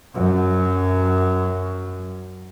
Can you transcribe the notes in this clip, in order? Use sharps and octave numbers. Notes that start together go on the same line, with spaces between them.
F#2 F#3